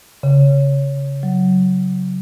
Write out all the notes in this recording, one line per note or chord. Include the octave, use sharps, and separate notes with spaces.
C#3
F#3